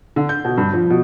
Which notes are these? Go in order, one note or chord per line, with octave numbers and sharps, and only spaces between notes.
D3
G6
B2
G2
F3
B2